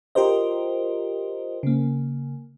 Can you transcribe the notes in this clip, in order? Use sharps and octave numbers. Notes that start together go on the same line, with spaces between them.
F4 G4 A#4 C5 D#5
C#3 A#3